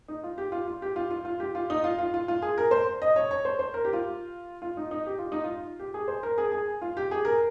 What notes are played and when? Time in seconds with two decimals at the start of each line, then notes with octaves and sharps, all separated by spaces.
0.08 D#4
0.23 F4
0.38 G4
0.52 F4
0.68 F4
0.82 G4
0.96 F4
1.11 F4
1.25 F4
1.40 G4
1.55 F4
1.70 D#4
1.84 F4
1.99 F4
2.14 F4
2.28 F4
2.42 G#4
2.58 A#4
2.71 C5
3.02 D#5
3.16 C#5
3.31 C#5
3.45 C5
3.59 C5
3.74 A#4
3.85 G4
3.93 F4
4.62 F4
4.77 D#4
4.91 D#4
5.06 G4
5.18 F4
5.32 D#4
5.44 F4
5.79 G4
5.94 G#4
6.08 C5
6.23 A#4
6.38 G#4
6.52 G#4
6.82 F4
6.97 G4
7.11 G#4
7.25 A#4